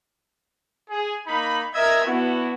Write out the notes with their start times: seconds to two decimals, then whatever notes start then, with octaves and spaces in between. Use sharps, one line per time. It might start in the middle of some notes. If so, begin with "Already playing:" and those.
0.90 G#4
1.27 A#3 D#4 B5
1.75 A#4 D#5 E5 G#6
2.06 B3 D4 E4 F#4